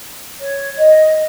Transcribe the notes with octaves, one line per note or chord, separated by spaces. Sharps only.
C#5
D#5